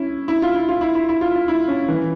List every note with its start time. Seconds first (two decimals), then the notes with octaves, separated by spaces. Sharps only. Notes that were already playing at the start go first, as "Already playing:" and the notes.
Already playing: C#4 E4
0.28 E4
0.42 F4
0.55 E4
0.69 F4
0.81 E4
0.95 E4
1.09 E4
1.21 F4
1.34 F4
1.48 E4
1.68 C#4
1.88 E3